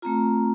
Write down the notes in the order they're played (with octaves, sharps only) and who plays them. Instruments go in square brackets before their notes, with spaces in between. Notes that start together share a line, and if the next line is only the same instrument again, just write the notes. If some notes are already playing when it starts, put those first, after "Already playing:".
[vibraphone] A3 C4 F4 A#5